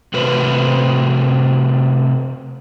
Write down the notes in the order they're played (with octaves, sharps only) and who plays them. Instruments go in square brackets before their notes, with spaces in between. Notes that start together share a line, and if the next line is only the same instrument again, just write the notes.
[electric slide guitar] C3 A3 F#4 B4 C5